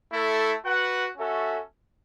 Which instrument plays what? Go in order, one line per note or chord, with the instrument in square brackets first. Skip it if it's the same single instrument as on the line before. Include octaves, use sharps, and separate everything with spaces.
[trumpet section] A3 E4 A4
F#4 B4 F#5
C#4 F#4 A4 E5